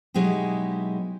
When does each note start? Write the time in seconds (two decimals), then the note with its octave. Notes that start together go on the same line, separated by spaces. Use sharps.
0.14 B2 F#3 G#3 D#4 E4 G4